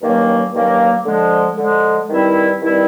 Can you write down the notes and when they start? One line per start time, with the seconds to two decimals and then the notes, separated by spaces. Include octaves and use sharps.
0.01 G2 D#3 F#3 A#3 C#4
0.53 G2 D#3 F#3 A#3 C#4
1.05 D3 F3 G#3
1.57 D3 F3 G#3
2.09 G2 D#3 G3 C4 E4
2.60 G2 D#3 G3 C4 E4